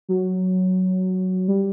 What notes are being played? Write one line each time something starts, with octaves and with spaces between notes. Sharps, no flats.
F#3
G3